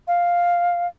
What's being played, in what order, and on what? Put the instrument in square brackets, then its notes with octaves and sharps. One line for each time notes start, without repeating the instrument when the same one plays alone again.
[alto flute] F5